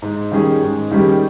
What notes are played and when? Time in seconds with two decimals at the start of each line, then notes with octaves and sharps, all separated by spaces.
0.02 G#2
0.32 D#3 G3 C#4 G#4
0.62 G#2
0.91 D#3 G3 C#4 G#4